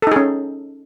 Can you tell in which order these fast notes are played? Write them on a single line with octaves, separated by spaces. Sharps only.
A4 D#4 G#4 C#4